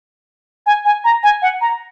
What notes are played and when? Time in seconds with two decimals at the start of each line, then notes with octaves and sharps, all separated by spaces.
0.66 G#5
0.85 G#5
1.04 A#5
1.23 G#5
1.42 F#5
1.61 A#5